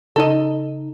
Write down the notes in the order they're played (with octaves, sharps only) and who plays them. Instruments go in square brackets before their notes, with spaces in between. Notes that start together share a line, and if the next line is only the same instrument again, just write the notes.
[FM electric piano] C#3 D#4 [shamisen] A4 D#5